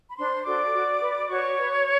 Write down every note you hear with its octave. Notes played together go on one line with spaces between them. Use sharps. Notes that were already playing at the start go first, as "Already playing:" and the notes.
B5
D4 C5 C6
F#4 A4 C5 D5 D6
F#4
B4
F#4 C#5 C#6
B4